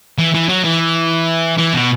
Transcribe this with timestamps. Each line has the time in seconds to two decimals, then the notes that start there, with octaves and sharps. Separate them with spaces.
0.18 E3
0.34 E3
0.49 F#3
0.65 E3
1.58 E3
1.74 B2